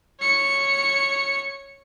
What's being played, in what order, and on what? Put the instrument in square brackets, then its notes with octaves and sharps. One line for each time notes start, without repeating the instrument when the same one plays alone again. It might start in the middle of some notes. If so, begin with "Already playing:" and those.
[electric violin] C#5 C#7